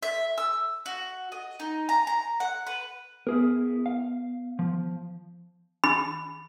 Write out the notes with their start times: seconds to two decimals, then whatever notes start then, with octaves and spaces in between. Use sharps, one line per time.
0.03 E5
0.38 E6
0.86 F#4
1.32 D#5
1.60 D#4
1.89 A#5
2.07 A#5
2.40 F#5
2.67 B4
3.27 B3 E4 G#4 A#4
3.86 F5
4.59 F3
5.84 B5